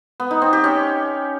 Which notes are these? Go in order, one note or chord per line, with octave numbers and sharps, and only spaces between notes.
B3
D#4
C4
G4
C#4